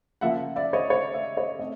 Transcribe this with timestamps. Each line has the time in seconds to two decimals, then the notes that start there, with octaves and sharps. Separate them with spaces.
0.21 C#3 F3 A#3 E5 F#5
0.56 D5 E5
0.73 C#5 D#5
0.90 C#5 D#5
1.13 D5 E5
1.37 C#5 D#5
1.59 A3 C4 D#5